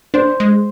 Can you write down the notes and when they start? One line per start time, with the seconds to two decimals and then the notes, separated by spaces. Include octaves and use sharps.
0.14 D4 C5
0.40 G#3